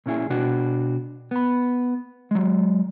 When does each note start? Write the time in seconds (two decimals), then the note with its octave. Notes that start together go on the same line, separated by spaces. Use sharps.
0.06 A#2 C#4 E4 G#4
0.30 B2 D4 F#4
1.31 B3 B5
2.31 F#3 G#3